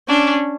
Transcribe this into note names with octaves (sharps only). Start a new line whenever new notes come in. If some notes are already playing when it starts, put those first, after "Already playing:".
C#4 D4